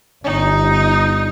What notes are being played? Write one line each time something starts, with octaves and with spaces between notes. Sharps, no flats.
G1 D#4